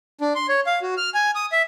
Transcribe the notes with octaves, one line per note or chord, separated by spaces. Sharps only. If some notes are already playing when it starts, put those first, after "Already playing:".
D4
C6
C#5
F5
F#4
F6
G#5
D#6
E5